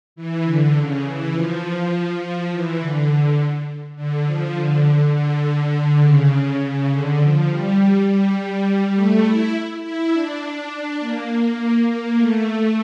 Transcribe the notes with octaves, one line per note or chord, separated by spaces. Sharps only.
E3
D3
C#3
E3
F3
F3
E3
D3
D3
F3
D3
D3
C#3
C#3
D3
F3
G3
G3
A3
E4
E4
D4
A#3
A#3
A3